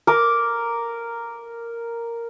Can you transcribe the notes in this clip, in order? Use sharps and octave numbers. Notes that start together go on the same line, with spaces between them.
A#4 D6